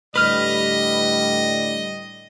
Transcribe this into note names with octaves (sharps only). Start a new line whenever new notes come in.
A2 D3 G3 B4 D#5 F6